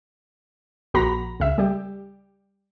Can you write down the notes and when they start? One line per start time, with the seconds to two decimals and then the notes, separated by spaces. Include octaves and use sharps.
0.94 A#1 F#4 A#5 B5
1.40 C#2 E5
1.58 G3 G4